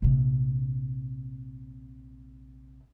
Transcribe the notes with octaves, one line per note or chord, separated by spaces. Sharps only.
A#1 C3